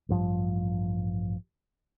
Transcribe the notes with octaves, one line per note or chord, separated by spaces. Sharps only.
A1 G2 F3